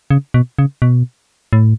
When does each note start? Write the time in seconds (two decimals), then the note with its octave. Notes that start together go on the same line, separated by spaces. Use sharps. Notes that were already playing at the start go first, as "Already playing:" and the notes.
0.11 C#3
0.34 B2
0.59 C#3
0.82 B2
1.53 A2